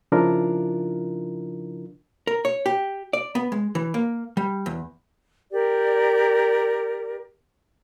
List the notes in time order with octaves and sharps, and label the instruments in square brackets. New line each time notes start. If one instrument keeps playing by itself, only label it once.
[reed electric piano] C#3 F3 D4 E4 F4 A#4
[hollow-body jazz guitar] A#4
C#5
G4
D5
B3
G#3
E3
A#3
G3
E2
[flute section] G4 A#4 D5